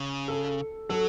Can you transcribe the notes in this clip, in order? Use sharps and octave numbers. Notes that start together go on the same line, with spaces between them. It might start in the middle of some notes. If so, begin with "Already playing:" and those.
Already playing: C#3
A4
F#3 A4